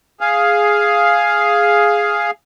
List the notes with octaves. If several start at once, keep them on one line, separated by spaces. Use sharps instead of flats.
G#4 F5